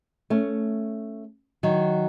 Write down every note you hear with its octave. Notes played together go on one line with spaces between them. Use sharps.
A3 C#4
D#3 F#3